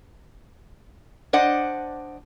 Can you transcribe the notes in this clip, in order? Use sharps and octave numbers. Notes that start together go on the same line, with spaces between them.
D4 C5 D5 D#5 F#5